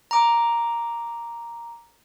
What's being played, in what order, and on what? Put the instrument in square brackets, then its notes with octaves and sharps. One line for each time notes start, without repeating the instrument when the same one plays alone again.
[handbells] A#5 D6